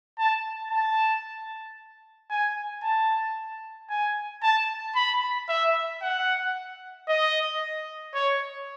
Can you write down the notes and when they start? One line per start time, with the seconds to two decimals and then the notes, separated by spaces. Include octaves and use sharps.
0.18 A5
0.71 A5
2.30 G#5
2.83 A5
3.90 G#5
4.43 A5
4.95 B5
5.49 E5
6.02 F#5
7.09 D#5
8.14 C#5